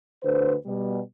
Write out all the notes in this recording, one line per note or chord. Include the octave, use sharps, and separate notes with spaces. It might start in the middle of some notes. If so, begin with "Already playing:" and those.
D2 D3 B4 C5
B2 G3